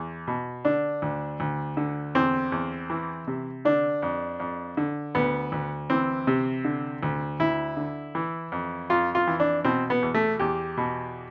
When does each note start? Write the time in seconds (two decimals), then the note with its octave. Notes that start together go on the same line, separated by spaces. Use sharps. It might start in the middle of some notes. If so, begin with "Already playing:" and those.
Already playing: E2
0.28 B2
0.65 D3 D4
1.02 D2
1.40 D2
1.77 D3
2.15 E2 C4
2.52 E2
2.90 E3
3.27 C3
3.65 D3 D4
4.03 F2
4.40 F2
4.77 D3
5.15 D2 B3
5.52 D2
5.90 E3 C4
6.27 C3
6.65 D3
7.03 D2
7.40 D2 E4
7.77 D3
8.15 E3
8.52 F2
8.90 F2 F4
9.15 F4
9.28 E3
9.40 D4
9.65 B2 C4
9.90 B3
10.03 E2
10.15 A3
10.39 E2 G4
10.77 B2